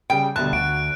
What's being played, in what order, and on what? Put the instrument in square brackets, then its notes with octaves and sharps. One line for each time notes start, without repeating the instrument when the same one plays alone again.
[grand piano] C#3 G3 [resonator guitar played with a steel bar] G5
[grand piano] D2 B2 G3 [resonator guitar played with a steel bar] A5 [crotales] F#6
[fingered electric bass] D2 [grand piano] F#4 [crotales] D7